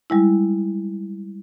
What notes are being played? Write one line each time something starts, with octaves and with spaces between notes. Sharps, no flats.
G3 G#3 E4